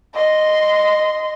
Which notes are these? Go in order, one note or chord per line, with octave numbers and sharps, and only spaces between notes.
D#5 C6